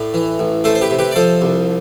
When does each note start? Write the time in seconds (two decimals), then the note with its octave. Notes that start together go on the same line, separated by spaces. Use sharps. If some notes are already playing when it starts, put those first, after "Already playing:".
Already playing: A2 B4 D5
0.14 E3
0.39 A1
0.64 A3 A4 C5
0.75 C5
0.81 G4 B4
0.90 C3
0.99 G4 B4
1.11 D5
1.16 F3 A4 C5
1.41 C2